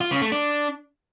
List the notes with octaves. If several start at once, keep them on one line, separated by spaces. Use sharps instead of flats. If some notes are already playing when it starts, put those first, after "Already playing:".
F4
C#3
A3
D4